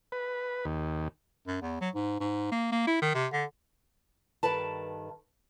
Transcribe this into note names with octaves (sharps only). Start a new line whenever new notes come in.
B4
D#2
F#2
E2
F#3
G#2
G#2
A#3
A#3
E4
D#3
C3
D3
G2 D#3 A4 B4 A5